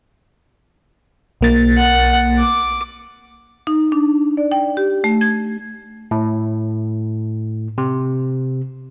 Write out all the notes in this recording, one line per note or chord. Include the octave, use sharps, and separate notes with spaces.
B1 A#3 A6
F#5
D6
D#4
D4
D5
G5
G4
A3
G#6
A2
C3